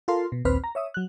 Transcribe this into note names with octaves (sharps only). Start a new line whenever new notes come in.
F4 A4 A#4 F5 A5 C6
B2
A#1 D#2 C4 B4 C5 F6
A#5
C#5 E5 D#6
F#3 F#6